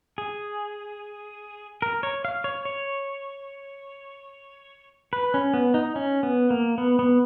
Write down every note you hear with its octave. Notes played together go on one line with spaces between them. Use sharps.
G#4
A#4
C#5
F5
C#5
C#5
B4
C#4
B3
D#4
C#4
B3
A#3
B3
B3